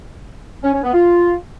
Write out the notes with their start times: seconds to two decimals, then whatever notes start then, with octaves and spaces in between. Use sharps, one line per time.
0.63 C#4
0.74 C#4
0.84 B3
0.94 F4